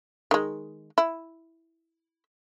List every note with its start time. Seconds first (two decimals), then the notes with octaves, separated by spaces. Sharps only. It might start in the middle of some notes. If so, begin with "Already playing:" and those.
0.31 D#3 G#3
0.98 E4